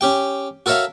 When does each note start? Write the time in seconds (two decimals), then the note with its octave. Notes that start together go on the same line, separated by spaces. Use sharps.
0.01 C#4 G4 G5
0.66 F#4 A4 A#4 C#5 E5 F5